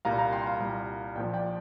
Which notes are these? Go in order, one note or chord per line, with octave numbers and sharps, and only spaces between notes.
C2 A#2 G3 F5 A#5
F5 A#5
G5 C6
F5 A#5
C2 A#2 G3
A#1 A#2 F3 D5 G5
D5 G5